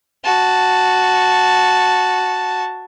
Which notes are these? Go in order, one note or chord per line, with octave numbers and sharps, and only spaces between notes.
F#4 A5